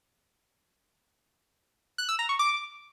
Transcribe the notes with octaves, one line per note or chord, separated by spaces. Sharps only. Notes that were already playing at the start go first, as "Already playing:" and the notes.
F#6
E6
A#5
C#6
D6